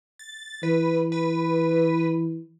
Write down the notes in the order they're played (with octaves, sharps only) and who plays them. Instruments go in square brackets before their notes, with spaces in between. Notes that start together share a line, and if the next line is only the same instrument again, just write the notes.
[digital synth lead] A6
[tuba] E3 [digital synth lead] B4
[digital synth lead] B4